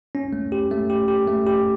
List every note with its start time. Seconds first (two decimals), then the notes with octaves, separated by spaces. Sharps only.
0.15 C#4
0.33 A3
0.52 G4
0.71 A3
0.90 G4
1.08 G4
1.27 A3
1.47 G4